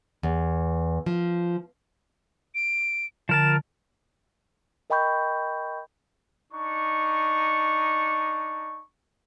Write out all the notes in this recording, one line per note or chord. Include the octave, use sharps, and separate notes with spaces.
E2
F3
D7
D3 F3 A#4 A5 E7
A#4 D#5 G5 B5 C#6 G6
D4 D#4 C#6